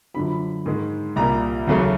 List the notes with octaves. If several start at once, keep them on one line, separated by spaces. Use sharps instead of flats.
F#2 D3 F3 B5
G#2 D#3 G#3
C2 A#2 G3 A#3 A#5
D#2 C#3 F#3 A3